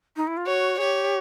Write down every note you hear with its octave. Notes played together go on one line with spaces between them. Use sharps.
D#4
E4
F4
F#4 C#5
G4 G#4 C#5